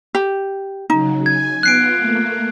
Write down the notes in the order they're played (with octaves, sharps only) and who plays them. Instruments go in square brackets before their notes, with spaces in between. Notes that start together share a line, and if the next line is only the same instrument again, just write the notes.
[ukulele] G4
[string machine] C#3 F#3 [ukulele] D#4
[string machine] G#5 [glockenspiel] G#6
[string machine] B3 F4 [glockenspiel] F#6 C7 D7
[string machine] A3 A#3